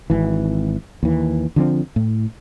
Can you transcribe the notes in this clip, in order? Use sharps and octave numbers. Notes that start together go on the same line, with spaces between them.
G#1 E3
D#2 E3
D3 F3 C4
A2